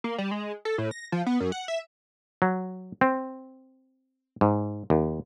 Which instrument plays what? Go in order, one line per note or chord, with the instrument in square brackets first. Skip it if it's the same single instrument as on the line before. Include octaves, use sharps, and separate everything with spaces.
[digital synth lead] A#3
G3
G#3
A4
A2
A#6
F3
B3
F#2
F#5
E5
[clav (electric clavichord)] F#3
C4
G#2
D#2